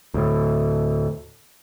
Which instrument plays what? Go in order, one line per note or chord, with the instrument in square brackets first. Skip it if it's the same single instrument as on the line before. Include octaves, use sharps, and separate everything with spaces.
[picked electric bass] D2 A2